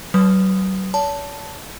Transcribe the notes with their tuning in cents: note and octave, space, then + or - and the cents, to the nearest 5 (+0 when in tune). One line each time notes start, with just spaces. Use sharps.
F#3 +40 B4 +0 D#6 +0
C#5 +45 A5 +0